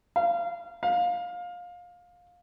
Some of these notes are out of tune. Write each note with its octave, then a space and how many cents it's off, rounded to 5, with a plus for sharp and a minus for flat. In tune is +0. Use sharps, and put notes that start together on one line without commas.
F5 -25
F5 +20